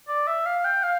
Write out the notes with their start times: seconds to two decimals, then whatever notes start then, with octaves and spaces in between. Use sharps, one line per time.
0.08 D5
0.27 E5
0.46 F5
0.64 G5
0.83 F5